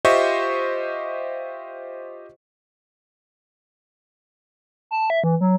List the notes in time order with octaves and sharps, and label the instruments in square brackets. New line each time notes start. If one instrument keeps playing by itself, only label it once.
[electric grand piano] F4 G4 C5 D#5 E5 C#6
[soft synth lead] A5
E5
E3
F#3